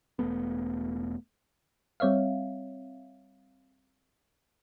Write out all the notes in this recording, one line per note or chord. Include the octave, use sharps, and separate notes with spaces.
E1 A3 B3
G3 C4 C#5 E5 F5